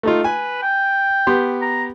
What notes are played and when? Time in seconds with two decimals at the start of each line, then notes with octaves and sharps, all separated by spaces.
0.03 A3 D#4 F4
0.24 B4 G#5
0.62 G5
1.27 B3 G4 C6
1.62 A#5